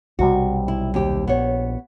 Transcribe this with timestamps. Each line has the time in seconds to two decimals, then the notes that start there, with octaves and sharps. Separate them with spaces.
0.19 B1 C3 G3 F#4
0.68 E4
0.94 D#2 G4
1.28 A#1 B3 C#5